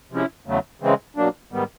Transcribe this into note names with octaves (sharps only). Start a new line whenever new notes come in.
C3 F3 G#3 C#4 E4
E2 C#3 F#3 A3
C#3 E3 G#3 C4
B2 F#3 A#3 D4
G#2 D#3 G3 B3